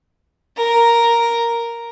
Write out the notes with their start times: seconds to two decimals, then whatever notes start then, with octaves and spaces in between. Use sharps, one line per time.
0.57 A#4